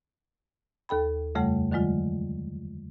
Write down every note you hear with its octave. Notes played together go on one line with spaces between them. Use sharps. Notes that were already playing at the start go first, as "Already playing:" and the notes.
D#2 A4 G5 B5
F2 C#3 G3 A3 F#5
D3 D#3 F#3 G#3 F4